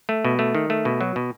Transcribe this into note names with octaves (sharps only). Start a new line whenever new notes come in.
A3
B2
A3
D#3
A3
B2
F#3
B2